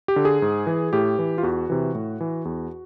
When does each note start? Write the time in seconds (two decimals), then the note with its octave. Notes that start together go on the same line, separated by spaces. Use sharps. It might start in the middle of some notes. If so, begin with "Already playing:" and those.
0.08 G4
0.16 D3
0.25 G#4
0.42 G#2
0.67 E3
0.93 A2 G4
1.19 E3
1.38 F4
1.43 E2 F#4
1.70 C3 E3
1.95 A2
2.20 E3
2.45 E2